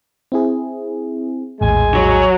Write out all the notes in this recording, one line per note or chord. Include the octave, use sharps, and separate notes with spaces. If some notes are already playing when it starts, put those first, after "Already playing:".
C4 E4 G#4
A#1 E2 A2 G#3 G#5
F#3